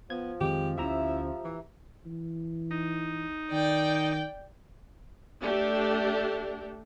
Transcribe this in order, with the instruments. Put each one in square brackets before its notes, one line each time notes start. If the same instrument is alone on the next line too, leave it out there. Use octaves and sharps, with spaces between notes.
[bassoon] F3 [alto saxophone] B3 [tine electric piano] G#6
[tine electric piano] F2 G#3 C4 [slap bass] D#3 [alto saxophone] G4
[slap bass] D2 A#3 C#4 [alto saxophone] E4 [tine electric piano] G4 E5 A#5
[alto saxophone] E3
[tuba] E3
[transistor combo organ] D#4
[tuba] D#3 [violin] D5 G5
[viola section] A3 D4 G4